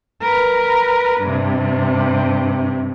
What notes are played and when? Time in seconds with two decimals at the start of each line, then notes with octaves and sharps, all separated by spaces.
0.21 A#4 B4
1.21 G2 C3